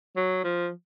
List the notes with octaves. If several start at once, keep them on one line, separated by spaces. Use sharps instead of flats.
F#3
F3